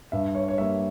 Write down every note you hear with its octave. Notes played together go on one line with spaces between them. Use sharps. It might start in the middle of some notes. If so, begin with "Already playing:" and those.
G2 E5
C#5
C#5
G3 A#3 E5